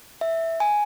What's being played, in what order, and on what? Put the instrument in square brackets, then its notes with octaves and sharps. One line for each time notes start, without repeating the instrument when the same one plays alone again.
[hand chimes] E5
G#5